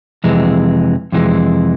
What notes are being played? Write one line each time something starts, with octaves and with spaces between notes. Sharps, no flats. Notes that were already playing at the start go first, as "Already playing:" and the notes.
F2 C3 E3 G#3
F2 C3 E3 G#3